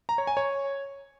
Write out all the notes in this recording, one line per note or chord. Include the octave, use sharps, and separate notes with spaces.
A#5
C#5
G#5
C#5